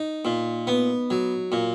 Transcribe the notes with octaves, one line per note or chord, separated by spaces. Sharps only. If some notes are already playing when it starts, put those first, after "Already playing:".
Already playing: D#4
A#2
B3
F#3
A#2